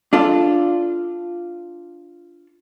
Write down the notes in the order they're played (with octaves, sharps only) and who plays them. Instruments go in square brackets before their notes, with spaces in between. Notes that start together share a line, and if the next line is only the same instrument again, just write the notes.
[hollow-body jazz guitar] D4 F4 A4